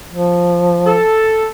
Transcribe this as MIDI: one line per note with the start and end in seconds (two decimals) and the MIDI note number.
0.11 0.99 53
0.86 1.48 69